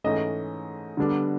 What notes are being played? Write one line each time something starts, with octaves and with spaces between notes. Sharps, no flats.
G#2 E3 A3 C#4 D#5
D3 G3 B3 D4